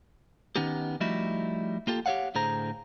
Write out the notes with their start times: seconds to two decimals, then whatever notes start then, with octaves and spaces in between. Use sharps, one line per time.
0.56 D#3 B3 C#4 D#4 G4
1.00 F3 G3 A3 D#4 E4 F#4
1.87 A#3 F4 G4 A4
2.06 G4 G#4 C#5 F5 F#5
2.35 A2 D3 G#4 C5 A#5